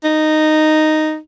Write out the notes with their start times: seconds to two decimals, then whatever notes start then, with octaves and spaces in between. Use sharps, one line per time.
0.04 D#4